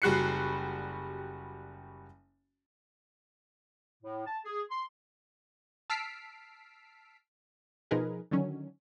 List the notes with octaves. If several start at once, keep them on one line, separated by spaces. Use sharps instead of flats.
F#1 G3 F#4 F#6 C7 C#7
A2
A5
G#4
C6
A5 E6 F6 B6 C7 D7
B2 F3 D#4 G#4 A#4 B4
D3 D#3 F#3 C#4